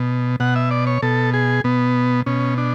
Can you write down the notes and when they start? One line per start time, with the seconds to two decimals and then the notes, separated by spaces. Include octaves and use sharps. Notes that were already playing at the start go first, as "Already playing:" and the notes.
Already playing: B2
0.40 B2 F#5
0.56 E5
0.71 D5
0.87 C#5
1.02 B2 A4
1.34 G#4
1.64 B2 B3
2.26 B2 C#4
2.57 D4